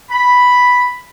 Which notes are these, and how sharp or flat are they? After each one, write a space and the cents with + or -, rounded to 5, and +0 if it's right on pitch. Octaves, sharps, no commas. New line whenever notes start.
B5 +0